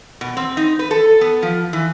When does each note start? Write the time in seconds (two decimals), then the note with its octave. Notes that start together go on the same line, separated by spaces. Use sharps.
0.21 B2
0.37 C4
0.57 D#4
0.79 B4
0.91 A4
1.21 B3
1.42 F3
1.73 E3